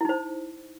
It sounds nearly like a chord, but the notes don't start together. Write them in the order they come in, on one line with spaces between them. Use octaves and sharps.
E4 D#4 C5